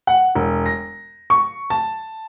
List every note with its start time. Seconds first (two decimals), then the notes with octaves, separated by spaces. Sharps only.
0.07 F#5
0.35 E1
0.66 A#6
1.30 C#6
1.70 A5